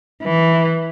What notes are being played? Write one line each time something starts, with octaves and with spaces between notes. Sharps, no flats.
E3